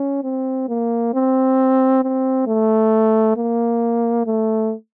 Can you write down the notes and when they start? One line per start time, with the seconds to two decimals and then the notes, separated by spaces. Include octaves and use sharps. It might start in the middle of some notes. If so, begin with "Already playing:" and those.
Already playing: C#4
0.24 C4
0.69 A#3
1.14 C4
2.04 C4
2.47 A3
3.37 A#3
4.27 A3